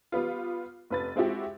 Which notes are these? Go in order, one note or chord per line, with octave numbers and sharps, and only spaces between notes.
G3 B3 F4
F1 B4 A6
G#3 C4 E4 F#4 G4